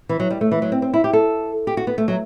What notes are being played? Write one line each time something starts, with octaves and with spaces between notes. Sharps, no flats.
E3
F#3
G3
A3
E3
F#3
C4
C4
E4
G4
A4
G4
F#4
B3
A3
F#3